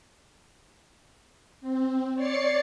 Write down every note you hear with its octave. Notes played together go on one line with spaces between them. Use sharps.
C4
C#5 D5 A6 C7 C#7